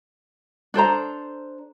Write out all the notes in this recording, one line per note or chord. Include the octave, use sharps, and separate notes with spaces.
D4 A4 C5 A#5